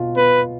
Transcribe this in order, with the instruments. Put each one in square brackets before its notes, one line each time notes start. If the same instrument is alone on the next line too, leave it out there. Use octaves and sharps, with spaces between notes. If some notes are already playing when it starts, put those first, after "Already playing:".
Already playing: [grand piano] B2 F4
[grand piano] B3 [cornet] B4